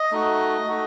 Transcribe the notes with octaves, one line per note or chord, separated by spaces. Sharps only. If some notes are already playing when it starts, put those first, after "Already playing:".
Already playing: D#5
A3 D#4 F#4
A3 D#4 F#4